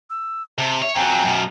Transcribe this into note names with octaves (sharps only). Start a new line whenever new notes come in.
E6
C3 A5
C#5 E5
F2 F#3 G5 G#5 A#5
F#2 B2